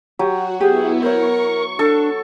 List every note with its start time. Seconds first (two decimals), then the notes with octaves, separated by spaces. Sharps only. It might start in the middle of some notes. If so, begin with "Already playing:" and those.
0.19 F#3 F#4 G4
0.61 B3 E4 G4 G#4
1.02 A#4 C5 C#5 C#6
1.79 D4 A4